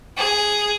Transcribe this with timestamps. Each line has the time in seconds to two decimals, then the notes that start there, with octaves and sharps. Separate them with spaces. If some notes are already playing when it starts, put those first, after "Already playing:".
0.17 G#4